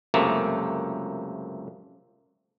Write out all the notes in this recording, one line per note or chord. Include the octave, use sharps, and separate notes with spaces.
C#2 F#2 C3 A3 A#3